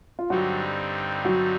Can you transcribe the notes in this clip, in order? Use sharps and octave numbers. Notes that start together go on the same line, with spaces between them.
F4
G2 D3 F#3 G3 C4 D#4 F#4
F#3 F#4